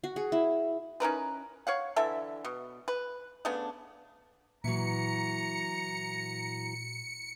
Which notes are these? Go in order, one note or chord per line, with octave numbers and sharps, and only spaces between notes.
F#4
G#4
E4
C#4 D#4 A#4 B4
C#5 F5 F#5
D3 E3 A4 E5
B2
B4
C#3 A3 B3 D4
A#2 E3 F#3 A#5 C#7